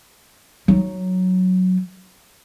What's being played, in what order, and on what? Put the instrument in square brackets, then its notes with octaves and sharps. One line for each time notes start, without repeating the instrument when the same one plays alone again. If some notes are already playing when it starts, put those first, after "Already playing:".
[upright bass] F#3 D#4